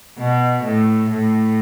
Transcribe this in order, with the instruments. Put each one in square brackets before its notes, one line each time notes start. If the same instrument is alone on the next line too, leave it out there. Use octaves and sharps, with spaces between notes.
[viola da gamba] B2
A2
A2